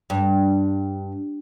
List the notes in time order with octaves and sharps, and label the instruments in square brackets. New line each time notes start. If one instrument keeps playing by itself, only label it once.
[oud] G2